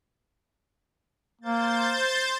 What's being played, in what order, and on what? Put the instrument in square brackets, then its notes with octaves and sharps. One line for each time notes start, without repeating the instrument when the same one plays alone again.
[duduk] A#3 [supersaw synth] C5 G6 A6